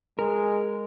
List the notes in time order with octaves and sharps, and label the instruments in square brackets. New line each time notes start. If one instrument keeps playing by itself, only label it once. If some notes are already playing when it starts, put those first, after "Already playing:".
[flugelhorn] G#3 [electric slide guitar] A#4